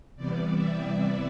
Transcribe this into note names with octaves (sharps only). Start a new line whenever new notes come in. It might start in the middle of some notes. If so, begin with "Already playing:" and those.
C3 E3 G3 B3 D5
E5